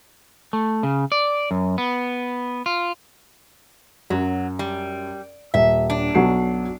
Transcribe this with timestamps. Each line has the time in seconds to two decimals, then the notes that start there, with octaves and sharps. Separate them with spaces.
0.53 A3
0.83 C#3
1.12 D5
1.51 F#2
1.78 B3
2.66 F4
4.10 F#2 F#3
4.59 G3
5.54 D#1 E5
5.90 D4
6.15 B1 F#3 C7